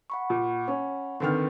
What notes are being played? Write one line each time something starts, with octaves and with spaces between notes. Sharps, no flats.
F#5 B5 C#6
A#2
C#4
D3 D#3 C4 B4 G5 F6